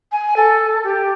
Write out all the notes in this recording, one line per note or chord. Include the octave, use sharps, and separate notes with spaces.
G#5
A4
G4